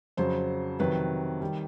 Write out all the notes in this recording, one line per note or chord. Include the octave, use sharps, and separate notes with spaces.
F2 C#3 F#3 C5
F2 C3 D#3 F#3 B4
D#3 G3